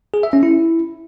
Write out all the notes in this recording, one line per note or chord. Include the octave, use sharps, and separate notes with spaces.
G#4
E5
C#4
E4